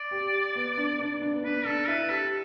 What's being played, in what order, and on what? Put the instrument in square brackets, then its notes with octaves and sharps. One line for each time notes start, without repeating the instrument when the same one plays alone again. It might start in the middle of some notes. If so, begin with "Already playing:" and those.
Already playing: [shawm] D5
[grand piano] G4
B3
D4
D4
D4
B3
[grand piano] D4 [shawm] B4
[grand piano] D4 [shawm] A4
[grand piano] E4 [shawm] B4
[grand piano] G4 [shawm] A4